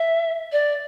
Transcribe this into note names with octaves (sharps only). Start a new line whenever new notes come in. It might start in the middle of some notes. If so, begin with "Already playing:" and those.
Already playing: E5
D5